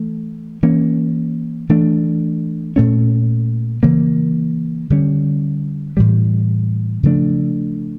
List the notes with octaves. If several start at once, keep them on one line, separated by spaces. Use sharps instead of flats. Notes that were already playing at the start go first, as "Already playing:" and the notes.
Already playing: E3 A3
E3 A#3 C#4
E3 A3 D4
A#2 A3 C#4
C#3 E3 A#3
D3 G3 C#4
A2 E3 G3
C#3 F3 A3 D4